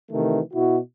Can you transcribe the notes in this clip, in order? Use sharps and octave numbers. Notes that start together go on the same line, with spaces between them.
C3 D#3 E3 A3
B2 E4 F#4